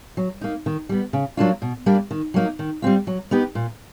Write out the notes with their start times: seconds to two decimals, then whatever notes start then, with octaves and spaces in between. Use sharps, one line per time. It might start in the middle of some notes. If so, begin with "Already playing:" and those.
0.17 F#3
0.41 A#3 D#4
0.66 D#3
0.89 G3 B3
1.13 C#3
1.37 F#3 A#3 D4 F4
1.62 B2
1.86 G3 A#3 D4
2.11 D#3
2.34 F#3 A#3 D#4
2.59 D#3
2.82 G3 C4 F4
3.07 F#3
3.31 B3 D#4 G4 B4
3.55 A#2